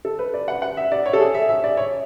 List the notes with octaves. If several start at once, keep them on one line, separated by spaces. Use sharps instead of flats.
A4
B4
D5
F#5
F#5
E5
D5
C#5
A4
G#4
E5
E5
D5
C#5